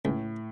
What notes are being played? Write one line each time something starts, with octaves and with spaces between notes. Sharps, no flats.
C#2 A2